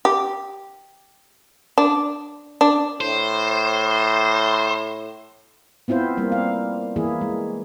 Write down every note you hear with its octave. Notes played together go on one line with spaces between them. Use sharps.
G4
D4
D4
A2 C5
B3 C4 E4 F4 C5
G3 A#3 C4
F5
E3 A#3 E4 G#4
G#3